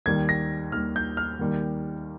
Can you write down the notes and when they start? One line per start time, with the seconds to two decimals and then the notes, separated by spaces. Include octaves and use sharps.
0.06 D#2 D#3 G3 G#6
0.29 A#6
0.72 D#2 D#3 G3 F6
0.96 G6
1.17 F6
1.39 D#2 D#3 G3